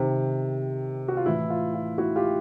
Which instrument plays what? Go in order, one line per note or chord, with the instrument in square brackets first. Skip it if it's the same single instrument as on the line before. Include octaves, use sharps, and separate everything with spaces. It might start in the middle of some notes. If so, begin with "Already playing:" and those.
Already playing: [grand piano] C3 D#3
F#4
F4
A2 E3 E4
F4
F4
E4 F#4
F4 G4